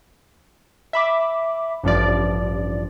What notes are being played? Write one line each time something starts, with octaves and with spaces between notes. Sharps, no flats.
E5 B5 D6
A1 G2 F3 D5